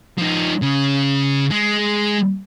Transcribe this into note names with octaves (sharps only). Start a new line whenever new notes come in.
F3 D#4
C#3 C#4
G#3